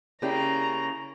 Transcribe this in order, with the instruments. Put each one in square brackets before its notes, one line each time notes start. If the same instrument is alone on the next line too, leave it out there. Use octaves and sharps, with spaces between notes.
[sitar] C#3 A#3 [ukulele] E4 G4 D5 [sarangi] A#5